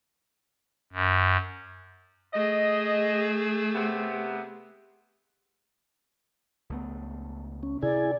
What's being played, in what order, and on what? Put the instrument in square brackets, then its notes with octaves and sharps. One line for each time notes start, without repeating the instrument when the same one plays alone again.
[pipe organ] F#2
[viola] A3 G#4 [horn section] D#5
[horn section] C3 B3
[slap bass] C#2 A3 B3
[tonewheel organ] C#4
[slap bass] C3 [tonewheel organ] E4 G#4 G#5 [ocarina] D5